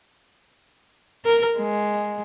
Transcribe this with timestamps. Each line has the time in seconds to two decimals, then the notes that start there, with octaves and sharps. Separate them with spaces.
1.25 A#4
1.58 G#3